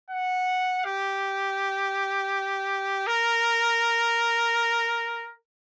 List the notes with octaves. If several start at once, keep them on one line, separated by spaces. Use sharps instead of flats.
F#5
G4
A#4